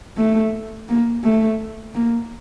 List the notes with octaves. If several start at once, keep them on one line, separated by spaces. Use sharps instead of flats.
A3
A#3
A3
A#3